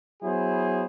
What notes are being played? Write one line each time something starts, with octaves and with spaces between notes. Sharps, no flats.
F#3 B3 E4 G#4 C5